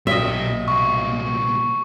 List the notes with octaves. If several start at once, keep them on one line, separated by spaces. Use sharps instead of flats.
B1 A#2 G4 D#5 E5
C2 A#2 C#6